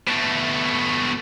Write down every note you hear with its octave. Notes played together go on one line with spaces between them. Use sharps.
B2 A3